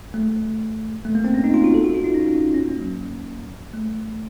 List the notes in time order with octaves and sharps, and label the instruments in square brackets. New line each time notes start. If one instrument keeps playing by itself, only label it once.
[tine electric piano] A3
A3
A#3
C4
C#4
D#4
F4
F#4
A4
F#4
F4
D#4
C#4
C#4
A#3
F#3
A3